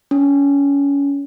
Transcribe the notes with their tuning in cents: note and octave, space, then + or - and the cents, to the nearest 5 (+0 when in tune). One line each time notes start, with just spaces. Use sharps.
C#4 +25